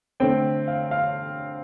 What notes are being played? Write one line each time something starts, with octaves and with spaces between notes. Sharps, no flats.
D3 A3 C4 G5
F5
F5